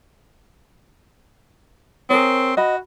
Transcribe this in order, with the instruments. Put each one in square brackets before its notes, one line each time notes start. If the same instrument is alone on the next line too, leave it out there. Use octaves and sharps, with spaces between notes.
[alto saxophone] C4 [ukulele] G#4 A#4 C#5
[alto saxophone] F#4 [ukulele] D#5 B5